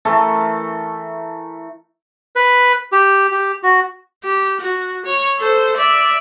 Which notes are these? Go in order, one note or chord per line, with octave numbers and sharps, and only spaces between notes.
E3 A3 A4 A#4
B4
G4
G4
F#4
G4
F#4
C#5
A4 C5
D5 E5